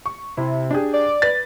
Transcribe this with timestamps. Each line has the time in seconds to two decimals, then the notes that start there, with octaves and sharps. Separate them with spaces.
0.06 C#6
0.37 C3 E4
0.71 D4 G4 G#4
0.93 D5
1.22 B4 A6